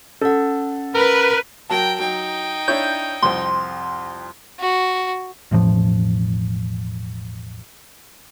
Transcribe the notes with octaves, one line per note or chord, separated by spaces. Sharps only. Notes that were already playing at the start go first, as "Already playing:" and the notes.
C#4 A4 F#5
A#4 B4
F#3 A#4 G5 A5
F#3 D#4 G5
D4 E4 C#5 G6
C2 F2 C4 C6
F#4
E1 A1 A2 F3